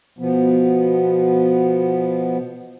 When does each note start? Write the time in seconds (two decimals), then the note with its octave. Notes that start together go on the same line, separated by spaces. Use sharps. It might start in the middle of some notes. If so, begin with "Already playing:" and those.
0.19 B2 F3 B3